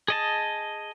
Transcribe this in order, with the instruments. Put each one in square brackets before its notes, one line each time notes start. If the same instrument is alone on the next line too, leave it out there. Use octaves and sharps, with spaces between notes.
[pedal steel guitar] G#4 D#5 A5